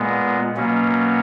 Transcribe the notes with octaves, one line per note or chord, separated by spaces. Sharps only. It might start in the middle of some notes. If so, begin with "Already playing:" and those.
Already playing: A#2 G#3 B3
B2 F#3 A#3 C#4